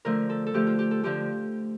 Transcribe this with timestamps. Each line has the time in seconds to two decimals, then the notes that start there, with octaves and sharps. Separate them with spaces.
0.05 D3 F3 A3 A#4
0.30 A4
0.46 A4
0.54 D3 F3 A3 G4
0.67 F4
0.79 G4
0.91 A4
1.03 D3 F3 A3 G4